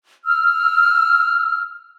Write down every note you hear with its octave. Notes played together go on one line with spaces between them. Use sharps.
E6 F6